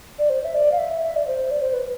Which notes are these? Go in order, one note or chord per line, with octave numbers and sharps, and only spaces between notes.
D5
C5
E5
D5
F5
E5
E5
D5
C5
D5
C5
B4